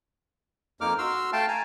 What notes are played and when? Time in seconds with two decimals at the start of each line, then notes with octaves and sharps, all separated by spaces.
0.81 F2 A#3 D#4 D6 F6
0.98 F#4 C6 E6 F6
1.33 A3 F5 G5 A5
1.48 G#5 A#5